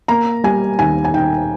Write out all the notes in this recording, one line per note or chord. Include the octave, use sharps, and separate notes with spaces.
A#3 A#5
G3 G#5
D#2 G#5
G#5
D#3 G5